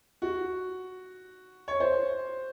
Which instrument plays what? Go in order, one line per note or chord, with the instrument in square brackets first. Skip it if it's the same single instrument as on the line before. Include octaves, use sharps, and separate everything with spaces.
[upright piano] F#4
C#5
C5